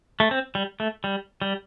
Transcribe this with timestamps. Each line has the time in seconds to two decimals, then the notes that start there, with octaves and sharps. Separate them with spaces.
0.20 A3
0.31 C4
0.55 G3
0.80 A3
1.04 G3
1.42 G3